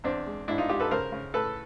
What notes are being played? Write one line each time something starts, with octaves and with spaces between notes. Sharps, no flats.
E2 C4 D4
G#3
G#2 D4 E4
D#4 F4
G#2 F4 G4
A4 B4
C#3 A#4 C5
C#3
A2 A4 B4